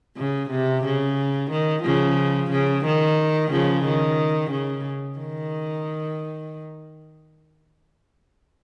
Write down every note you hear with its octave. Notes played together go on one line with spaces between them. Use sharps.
C#3
C3
C#3
D#3
C#3 F3
C#3
D#3
C#3 F3
D#3
C#3
D#3